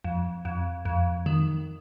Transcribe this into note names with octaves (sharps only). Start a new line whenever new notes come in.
F2
F2
F2
D#3